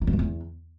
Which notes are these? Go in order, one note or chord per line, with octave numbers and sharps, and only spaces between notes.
E3
G2
F2
E2